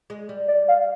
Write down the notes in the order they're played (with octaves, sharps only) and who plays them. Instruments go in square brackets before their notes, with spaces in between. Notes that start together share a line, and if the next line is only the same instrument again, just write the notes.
[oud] G#3
G3
[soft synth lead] D5
F5